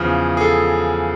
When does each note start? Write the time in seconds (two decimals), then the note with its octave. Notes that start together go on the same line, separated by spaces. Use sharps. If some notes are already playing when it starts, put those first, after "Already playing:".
Already playing: E2 C#3 F3
0.37 G#4
0.41 A4